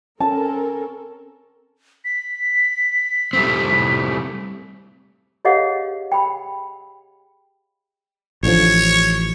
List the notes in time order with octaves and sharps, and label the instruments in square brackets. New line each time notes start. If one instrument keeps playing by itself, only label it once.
[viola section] C4 A4 A#4 [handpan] C#4 [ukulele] A5
[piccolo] B6
[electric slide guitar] G3 A3 C4
[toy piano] G4 G#4 C#5 D#5 F5 F#5
G5 B5
[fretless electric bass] A1 D3 F3 [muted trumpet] C#5